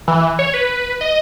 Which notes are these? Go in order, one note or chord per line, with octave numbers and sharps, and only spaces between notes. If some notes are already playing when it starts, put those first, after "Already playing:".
E3
C#5
B4
D#5